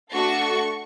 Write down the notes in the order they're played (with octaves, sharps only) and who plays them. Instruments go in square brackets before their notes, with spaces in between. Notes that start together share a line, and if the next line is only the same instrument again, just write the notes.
[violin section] A3 D4 F#4 A4 C#6